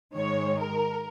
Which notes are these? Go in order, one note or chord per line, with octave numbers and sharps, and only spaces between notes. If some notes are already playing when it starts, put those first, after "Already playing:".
G#2 D#3 G#3 C#5
A#4